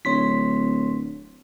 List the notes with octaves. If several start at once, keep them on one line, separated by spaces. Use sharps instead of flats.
D1 C#5 C6 B6